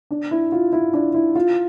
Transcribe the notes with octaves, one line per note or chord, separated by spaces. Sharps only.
D4
E4
F4
E4
D4
E4
F4